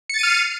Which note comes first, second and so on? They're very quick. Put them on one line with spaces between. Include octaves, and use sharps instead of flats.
C#7 A6 D#7 F6 C7